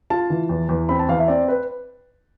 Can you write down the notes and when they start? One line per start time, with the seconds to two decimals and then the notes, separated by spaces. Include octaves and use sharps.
0.10 F4 A5
0.30 E3
0.49 E2
0.69 E2
0.89 C4 B5
0.99 A5
1.09 E2 F5
1.19 E5
1.28 C4 D5
1.48 B4